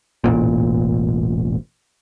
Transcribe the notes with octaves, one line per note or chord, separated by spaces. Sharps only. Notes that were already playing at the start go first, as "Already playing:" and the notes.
E1 A1 A#2